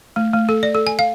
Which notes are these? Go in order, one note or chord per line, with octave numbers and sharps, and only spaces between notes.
A3
A3
A4
D5
A4
G#5
F5